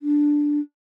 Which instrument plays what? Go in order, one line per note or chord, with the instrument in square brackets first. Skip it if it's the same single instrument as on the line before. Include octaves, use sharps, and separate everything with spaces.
[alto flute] D4